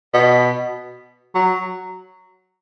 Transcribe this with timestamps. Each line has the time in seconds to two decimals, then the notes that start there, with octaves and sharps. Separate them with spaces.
0.14 B2
1.35 F#3